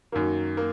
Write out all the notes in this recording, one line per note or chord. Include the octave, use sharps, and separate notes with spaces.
F#2 D#3 A#3
A#3